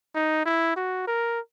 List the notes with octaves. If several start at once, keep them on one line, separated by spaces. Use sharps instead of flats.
D#4
E4
F#4
A#4